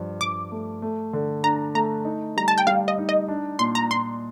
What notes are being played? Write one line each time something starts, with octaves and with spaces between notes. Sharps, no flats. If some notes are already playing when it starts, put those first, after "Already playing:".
Already playing: G2 F3
G2 D6
A3
A3
D3
D4 A#5
A3 A#5
D#4
G3 A#5
A5
G5
G3 F5
D#5
D#4
D#5
D4
A#2 C6
A#5
A#2 C6